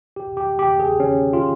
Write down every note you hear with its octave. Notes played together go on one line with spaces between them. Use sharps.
G4
G4
G4
G#4
C#4
F4